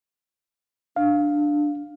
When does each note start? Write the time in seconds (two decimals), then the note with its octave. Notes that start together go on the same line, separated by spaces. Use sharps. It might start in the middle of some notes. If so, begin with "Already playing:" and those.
0.96 D4 F5